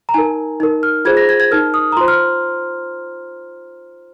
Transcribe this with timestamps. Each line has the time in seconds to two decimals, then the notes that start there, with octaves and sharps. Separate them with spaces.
0.09 A#5
0.14 D#4 A#4 G#5
0.60 D#4 A#4
0.83 F6
1.05 F4 G#4 C5 G#6
1.17 A#6
1.29 G#6
1.40 G#6
1.51 D#4 A#4 F6
1.74 D#6
1.92 A#5
1.97 F4 C5 C6
2.08 F6